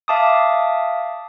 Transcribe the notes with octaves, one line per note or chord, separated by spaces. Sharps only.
E5 F5 A5 D6 D#6